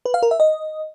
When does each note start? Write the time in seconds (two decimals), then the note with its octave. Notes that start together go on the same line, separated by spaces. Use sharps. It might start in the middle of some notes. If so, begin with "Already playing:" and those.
0.05 B4
0.14 F5
0.23 A#4
0.31 E5
0.40 D#5